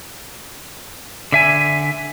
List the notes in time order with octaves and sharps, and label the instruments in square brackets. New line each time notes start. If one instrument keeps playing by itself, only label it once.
[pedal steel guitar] D3 E5 G#5